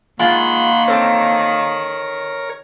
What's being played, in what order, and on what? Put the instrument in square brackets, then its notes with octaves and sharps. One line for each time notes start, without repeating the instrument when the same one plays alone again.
[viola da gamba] D#3 [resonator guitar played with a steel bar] G#3 F4 [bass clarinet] A#3 [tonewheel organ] F#5 B5 C6
[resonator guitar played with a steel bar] C4 A4 C5 [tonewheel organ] A#4 C#5